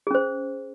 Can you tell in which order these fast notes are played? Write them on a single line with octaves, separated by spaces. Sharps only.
G#4 C#4 C5